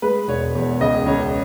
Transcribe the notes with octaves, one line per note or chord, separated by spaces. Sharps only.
G#3 B4
E1 C#5
E2
C#2 D#5
C#2 C#5